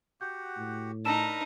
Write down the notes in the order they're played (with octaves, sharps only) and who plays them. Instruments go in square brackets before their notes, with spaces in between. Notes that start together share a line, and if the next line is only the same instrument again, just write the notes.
[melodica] F#4 G4 F#5 [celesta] G6
[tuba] A2
[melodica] D4 A#4 B5 [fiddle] D#4 [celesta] A5 E6 E7